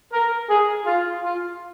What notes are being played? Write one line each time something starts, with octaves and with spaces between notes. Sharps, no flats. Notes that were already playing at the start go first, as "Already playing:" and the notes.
A#4
G#4
F4
F4